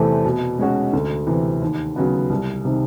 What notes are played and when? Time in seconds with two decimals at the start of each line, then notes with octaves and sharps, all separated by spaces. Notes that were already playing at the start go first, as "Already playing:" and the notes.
Already playing: E2 C3 E3 A3 C4
0.24 B2
0.59 G#3 C#4 F#4
0.93 D2
1.27 C3 E3
1.62 D#2
1.96 C#3 F#3 B3
2.30 C2
2.65 C3 D#3